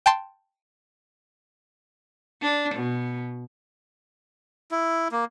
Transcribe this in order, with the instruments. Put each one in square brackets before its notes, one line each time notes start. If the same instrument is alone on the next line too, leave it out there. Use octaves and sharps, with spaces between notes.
[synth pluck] G5 A5 C6
[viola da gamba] D4
B2
[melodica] E4
A#3